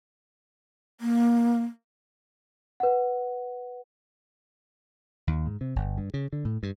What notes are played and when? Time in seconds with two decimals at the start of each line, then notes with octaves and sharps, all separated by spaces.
1.01 A#3
2.80 B4 F#5
5.27 D#2
5.46 G#2
5.61 C3
5.76 G1
5.98 G2
6.14 C#3
6.33 D3
6.45 A2
6.63 G2